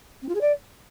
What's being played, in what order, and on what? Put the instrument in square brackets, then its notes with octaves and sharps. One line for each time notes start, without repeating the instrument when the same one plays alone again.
[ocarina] C4
F4
G#4
D5